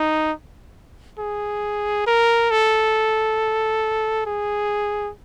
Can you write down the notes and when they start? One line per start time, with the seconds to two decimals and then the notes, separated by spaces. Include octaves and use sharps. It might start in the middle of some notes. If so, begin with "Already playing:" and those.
Already playing: D#4
1.19 G#4
2.07 A#4
2.51 A4
4.26 G#4